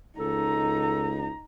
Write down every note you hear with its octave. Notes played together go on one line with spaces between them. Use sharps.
C#2 D#4 A4 A#5